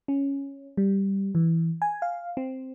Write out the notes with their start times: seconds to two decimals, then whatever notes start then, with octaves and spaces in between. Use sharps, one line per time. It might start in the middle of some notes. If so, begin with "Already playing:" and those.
0.08 C#4
0.77 G3
1.35 E3
1.82 G#5
2.02 F5
2.37 C4